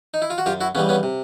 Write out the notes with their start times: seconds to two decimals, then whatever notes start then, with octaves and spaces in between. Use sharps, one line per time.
0.14 D#4
0.22 E4
0.30 F4
0.38 F#4
0.46 F#2 F4 G4
0.61 E4 F#4
0.75 C#3 E3 G3 B3 C#4
0.89 B3 C#4
1.03 C3